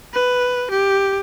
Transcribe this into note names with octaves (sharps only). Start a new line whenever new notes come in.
B4
G4